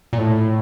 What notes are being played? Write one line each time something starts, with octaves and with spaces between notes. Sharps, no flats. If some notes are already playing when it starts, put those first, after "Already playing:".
A#2
A2